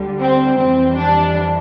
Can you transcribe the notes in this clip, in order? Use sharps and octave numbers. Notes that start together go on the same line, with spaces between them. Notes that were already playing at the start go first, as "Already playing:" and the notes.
Already playing: D2 D3 G3
C4
F2 E3 G3 C4
D4